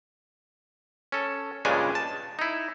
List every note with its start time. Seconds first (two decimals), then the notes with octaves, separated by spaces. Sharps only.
1.12 C#4 A4
1.65 G2 A#2 C#3 G#3 D4 G#5
1.95 A5
2.39 D#4 E4